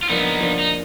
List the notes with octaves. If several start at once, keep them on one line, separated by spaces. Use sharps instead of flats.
F4
F3 A#3 B3 D4 D#4
F3 A#3 D4
D#4